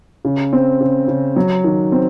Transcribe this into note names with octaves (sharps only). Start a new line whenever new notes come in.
C#3
C4
C#3
C#3
F#3
D#3
C4